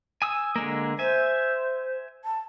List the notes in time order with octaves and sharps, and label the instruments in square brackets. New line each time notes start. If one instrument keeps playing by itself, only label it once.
[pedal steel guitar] G#5 D#6 E6
D3 G#3 A#3
[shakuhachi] C5 [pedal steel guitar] E5 G#5
[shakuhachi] A5